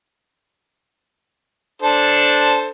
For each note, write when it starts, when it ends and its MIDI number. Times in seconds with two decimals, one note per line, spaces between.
1.82 2.67 62
1.82 2.67 69
1.82 2.67 72